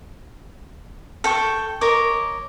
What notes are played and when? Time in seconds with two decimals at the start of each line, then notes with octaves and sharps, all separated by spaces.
1.24 A4 G5 C#6
1.81 A#4 C#5 D#5 D6